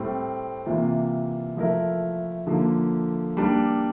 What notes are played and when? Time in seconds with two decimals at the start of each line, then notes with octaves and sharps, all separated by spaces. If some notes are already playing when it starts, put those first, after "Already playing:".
Already playing: A2 G3 C4
0.66 C3 E3 A#3 F4
1.57 F3 A3 E4 A#4
2.47 D3 F3 A#3
3.37 G3 A#3 D4